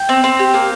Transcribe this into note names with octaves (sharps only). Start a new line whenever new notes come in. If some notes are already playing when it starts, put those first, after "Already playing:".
Already playing: G5
C4
C4
G4
A#3